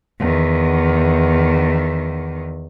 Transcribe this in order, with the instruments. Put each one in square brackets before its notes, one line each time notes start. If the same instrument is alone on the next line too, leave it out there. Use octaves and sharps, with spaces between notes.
[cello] E2 D#3